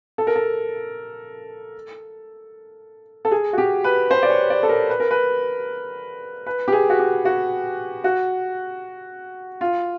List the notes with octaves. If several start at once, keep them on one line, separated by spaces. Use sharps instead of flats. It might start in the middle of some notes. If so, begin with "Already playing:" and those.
A4
A#4
A4
A4
G#4
F#4
G4
B4
C5
D5
C#5
D5
A4
A#4
B4
A#4
B4
B4
G4
G#4
F#4
G4
F#4
F#4
F4